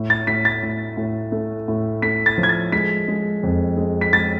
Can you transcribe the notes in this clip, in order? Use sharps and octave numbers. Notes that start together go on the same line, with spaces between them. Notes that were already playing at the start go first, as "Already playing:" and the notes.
Already playing: A2
A6
A2 B6
A6
A2
A2
A3
A2
A3 B6
A6
F3
G#6
A6
G#3 B6
G#3
F2
G#3
B6
G#3 A6